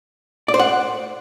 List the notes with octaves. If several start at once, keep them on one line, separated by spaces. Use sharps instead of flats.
D5
C5
F#5